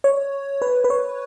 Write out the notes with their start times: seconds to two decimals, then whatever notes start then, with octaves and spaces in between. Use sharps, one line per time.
0.04 C#5
0.62 B4
0.84 B4
0.90 C#5